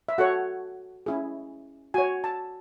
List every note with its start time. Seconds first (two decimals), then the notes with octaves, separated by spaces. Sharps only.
0.09 E5
0.18 F#4 A4 C#5 F#5
1.06 C#4 E4 G#4
1.94 F#4 C#5 G#5
2.24 A5